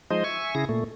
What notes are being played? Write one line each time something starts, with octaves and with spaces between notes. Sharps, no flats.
F3 G#3 D#4 C5 D#5
E5 G#5 C#6
C#3 E4 G#4 A#6
A#2 A3